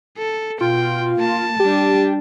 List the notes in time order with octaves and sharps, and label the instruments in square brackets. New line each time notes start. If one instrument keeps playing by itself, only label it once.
[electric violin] A4
[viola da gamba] B2 [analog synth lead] F4 [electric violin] G5
[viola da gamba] A#3 [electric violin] A5
[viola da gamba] G3 D4 [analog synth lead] G4